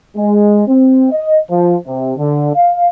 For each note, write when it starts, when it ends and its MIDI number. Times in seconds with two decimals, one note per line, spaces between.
0.16 0.62 56
0.67 1.06 60
1.11 1.37 75
1.50 1.75 53
1.86 2.12 48
2.17 2.50 50
2.55 2.86 77